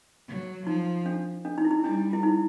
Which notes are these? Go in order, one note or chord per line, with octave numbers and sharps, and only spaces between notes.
F#3
F3 D#4
D4
D4
D#4
E4
D#4
G3 D4
E4
D#4